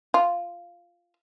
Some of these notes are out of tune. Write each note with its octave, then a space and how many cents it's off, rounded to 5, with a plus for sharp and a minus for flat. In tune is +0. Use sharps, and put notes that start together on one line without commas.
F4 -5